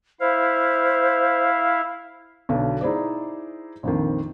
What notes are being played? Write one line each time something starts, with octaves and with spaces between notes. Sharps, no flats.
E4 C5 F5
B1 B2 D3
D#4 E4 G#4 C5 D5
A#1 F2 D#3